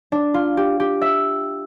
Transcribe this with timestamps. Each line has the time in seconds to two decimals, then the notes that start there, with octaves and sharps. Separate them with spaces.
0.12 D4
0.34 F4
0.57 G4
0.80 G4
1.02 E5